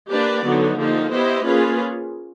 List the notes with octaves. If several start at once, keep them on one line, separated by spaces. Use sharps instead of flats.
A#3 D4 G4 B4 D5
D3 F#3 B3 D#4
D3 F3 A#3 D#4 G4
B3 E4 G4 C5 D#5
A#3 C#4 F4 G#4 B4